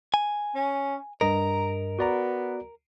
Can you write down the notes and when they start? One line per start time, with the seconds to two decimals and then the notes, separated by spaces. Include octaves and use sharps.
0.14 G#5
0.55 C#4
1.21 G2 A#4 D#5 A#5
1.99 B3 F#4 D5 A#5